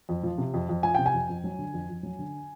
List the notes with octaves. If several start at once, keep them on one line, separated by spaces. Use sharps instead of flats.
F2
F3
C3
F2
F2
F3 G#5
C3 G5
G#5
F2
F2
F#3
D3
F2
F2
F#3
D3